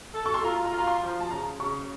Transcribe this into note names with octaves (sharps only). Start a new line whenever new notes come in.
A4
C#6
C6
F4 A#5
A#5
F4
A#5
C6
F3
A5
C#3 A#5
C#3 C#6